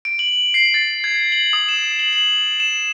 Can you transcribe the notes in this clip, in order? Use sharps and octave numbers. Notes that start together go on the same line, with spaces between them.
D7
F#7
C7
A6
G#6
F#7
D#6
E7
F#7
F#7
E7